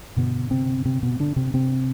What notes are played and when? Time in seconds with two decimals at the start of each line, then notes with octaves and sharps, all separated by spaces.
0.17 G2 B2 D3 B3
0.51 C3 C4
0.85 C3 C4
1.02 B2 B3
1.20 D3 D4
1.36 C3 C4
1.54 C3 C4